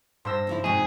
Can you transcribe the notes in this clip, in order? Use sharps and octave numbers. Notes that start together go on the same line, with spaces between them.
G2 C5 C6 E6 A#6
C#3 F3 E4
F2 G#2 B2 F3 G#4